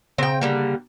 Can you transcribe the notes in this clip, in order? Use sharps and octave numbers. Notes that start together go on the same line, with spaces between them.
C#3 C4 G5
D3 G3 A#3